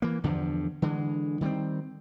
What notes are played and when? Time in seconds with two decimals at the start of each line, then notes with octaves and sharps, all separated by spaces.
0.02 E3 A#3
0.24 E2 G2 D3 F3
0.82 D3 E3 G#3
1.41 D#3 G3 A3 C4